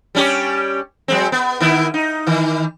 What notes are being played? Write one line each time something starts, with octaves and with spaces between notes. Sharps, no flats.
G3 C#4 G4
F#3 G#3 C4
B3
D#3 B3 E4
D#4
D#3 E3